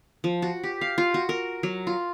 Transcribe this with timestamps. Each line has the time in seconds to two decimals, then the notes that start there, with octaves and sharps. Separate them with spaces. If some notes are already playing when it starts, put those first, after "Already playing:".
0.24 F3
0.42 F#4
0.63 G4
0.81 F5
0.98 F4
1.14 F#4
1.29 A#4
1.63 F#3
1.87 F4